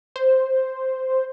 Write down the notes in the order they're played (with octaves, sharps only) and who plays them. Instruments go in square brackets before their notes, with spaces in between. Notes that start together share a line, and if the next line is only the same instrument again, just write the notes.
[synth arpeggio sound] C5